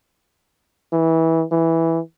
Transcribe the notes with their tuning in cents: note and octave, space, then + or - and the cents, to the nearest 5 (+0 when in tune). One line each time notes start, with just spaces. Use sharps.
E3 -20
E3 -5